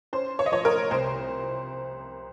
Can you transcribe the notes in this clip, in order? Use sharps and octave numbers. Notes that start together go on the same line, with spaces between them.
C#4 C5
C#5
D#5
F3 C#5
A#4
C2 C5